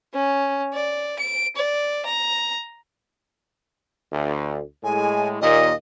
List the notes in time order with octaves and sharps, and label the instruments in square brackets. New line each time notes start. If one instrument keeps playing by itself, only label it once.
[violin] C#4
D5
D7
D5
A#5
[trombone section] D2
[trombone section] A2 G#3 [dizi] G#5
[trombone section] D#2 A#2 [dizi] D#5